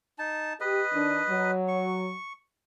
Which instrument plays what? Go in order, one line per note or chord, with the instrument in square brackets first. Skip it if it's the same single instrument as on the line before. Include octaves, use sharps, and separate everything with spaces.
[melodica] D#4 A5
[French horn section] G4 [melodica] B4 D#5
[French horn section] D#3 D4
F#3
[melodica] C#6